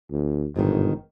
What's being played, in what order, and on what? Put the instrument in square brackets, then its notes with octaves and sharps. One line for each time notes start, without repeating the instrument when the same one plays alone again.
[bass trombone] D2
[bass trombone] G1 [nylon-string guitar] G#2 B2 D#3